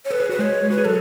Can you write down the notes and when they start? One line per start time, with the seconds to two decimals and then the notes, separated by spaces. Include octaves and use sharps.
0.05 C#5
0.10 A4 B4
0.20 G#4
0.29 F#4 B4
0.39 G#3 G#4 C#5
0.70 F#4 B4
0.78 G#4
0.85 F#3 A4